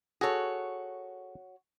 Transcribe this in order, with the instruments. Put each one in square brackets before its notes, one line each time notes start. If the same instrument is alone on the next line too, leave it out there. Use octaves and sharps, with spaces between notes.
[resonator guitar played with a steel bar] F#4 C#5 [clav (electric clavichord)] G#4 A4